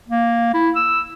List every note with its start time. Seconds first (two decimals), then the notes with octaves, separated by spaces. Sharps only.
0.09 A#3
0.54 E4
0.76 E6